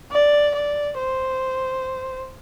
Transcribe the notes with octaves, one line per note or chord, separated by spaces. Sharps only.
D5
D5
C5